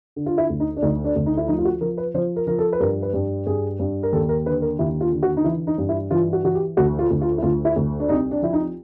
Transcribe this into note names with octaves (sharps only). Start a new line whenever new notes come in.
D3
F4
E4
D2
D#4
D4
D2 D#4
D4
D2
D#4
E4
F3 D#4
F4
F#4
F3 A#4
B4
F3 C5
A#4
F3 A#4
A4
B4
G2 A#4
B4
G2
G2 G#4
G2
A#4
D#2 A4
A#4
D3 B4
A#4
D#2 E4
F4
D3
F#4
D#4
E3 E4
D#4
G2
E4
E3 F4
F#4
E3 F#4
G4
D2 F#4
F4
D2
F4
E4
D2 F4
E4
D2
D4
C2 D#4
D4
F3 E4
D#4